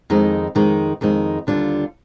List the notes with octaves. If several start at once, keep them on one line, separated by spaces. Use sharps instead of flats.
F2 D#3 G#3 D#4
F2 D#3 G#3 D#4
F2 D#3 G#3 D#4
D#2 D3 G3 D4 F4